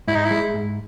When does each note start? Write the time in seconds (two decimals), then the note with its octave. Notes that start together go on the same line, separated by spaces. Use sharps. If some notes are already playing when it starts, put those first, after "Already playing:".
0.08 G#2 E4
0.16 D#4
0.25 E4
0.31 G#3
0.54 G#2